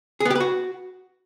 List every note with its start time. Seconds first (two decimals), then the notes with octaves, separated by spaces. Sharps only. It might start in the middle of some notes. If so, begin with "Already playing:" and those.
0.20 G#4
0.25 B3
0.30 G4
0.35 B4
0.40 F#4